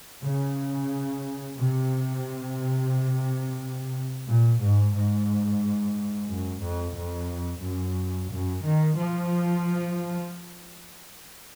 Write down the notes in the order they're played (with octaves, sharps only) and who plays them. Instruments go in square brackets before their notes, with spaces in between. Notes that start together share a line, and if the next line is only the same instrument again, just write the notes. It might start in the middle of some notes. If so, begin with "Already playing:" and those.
[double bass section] C#3
C3
A#2
G#2
G#2
F#2
F2
F2
F#2
F#2
D#3
F3